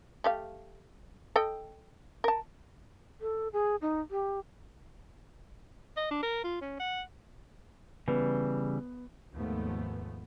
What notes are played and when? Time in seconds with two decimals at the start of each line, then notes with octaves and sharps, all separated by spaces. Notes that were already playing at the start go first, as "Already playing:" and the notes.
0.24 A3 G4 F5
1.36 A4 D#5 G5
2.24 A#4 A5
3.21 A4
3.53 G#4
3.82 D#4
4.11 G4
5.97 D#5
6.11 D4
6.22 A#4
6.44 F4
6.61 C#4
6.79 F#5
8.08 C#3 E3 G3 B3
9.34 D#2 G#2 F3 A3 B3